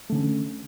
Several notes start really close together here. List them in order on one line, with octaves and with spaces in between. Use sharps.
A3 D3 C#4